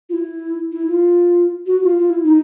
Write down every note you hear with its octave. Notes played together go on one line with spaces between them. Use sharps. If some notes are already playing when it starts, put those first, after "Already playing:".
F4
E4
E4
F4
F#4
F4
F4
E4
D#4